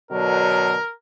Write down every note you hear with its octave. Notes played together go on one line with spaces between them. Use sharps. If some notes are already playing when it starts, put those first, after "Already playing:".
B2 D3 F#3 A#4